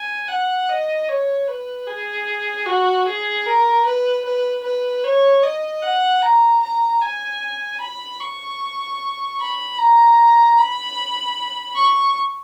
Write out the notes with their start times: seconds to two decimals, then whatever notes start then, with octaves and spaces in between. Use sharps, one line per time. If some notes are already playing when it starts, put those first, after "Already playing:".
Already playing: G#5
0.28 F#5
0.69 D#5
1.09 C#5
1.47 B4
1.87 G#4
2.66 F#4
3.06 G#4
3.46 A#4
3.85 B4
4.25 B4
4.64 B4
5.04 C#5
5.43 D#5
5.82 F#5
6.22 A#5
6.63 A#5
7.01 G#5
7.81 B5
8.20 C#6
9.40 B5
9.78 A#5
10.58 B5
11.76 C#6